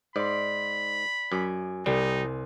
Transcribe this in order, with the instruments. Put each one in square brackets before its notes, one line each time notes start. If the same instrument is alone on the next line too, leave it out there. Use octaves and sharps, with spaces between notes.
[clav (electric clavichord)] G#2 [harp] D5 C6 [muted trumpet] B5
[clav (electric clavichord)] F#2 [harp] G#5 D6
[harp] C2 [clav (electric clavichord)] G3 [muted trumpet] D#4